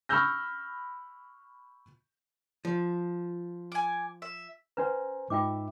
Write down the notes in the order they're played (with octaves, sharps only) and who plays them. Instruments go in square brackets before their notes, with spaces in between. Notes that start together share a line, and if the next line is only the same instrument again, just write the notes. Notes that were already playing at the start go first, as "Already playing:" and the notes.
[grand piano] B5 C#6 E6 F6 G6 A#6
[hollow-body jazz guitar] F3
[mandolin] G#5 D6
E5
[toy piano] C#4 B4 [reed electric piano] C5 G#5 A#5
[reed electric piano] G#2 D#4 E5 [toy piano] F4 G5 D6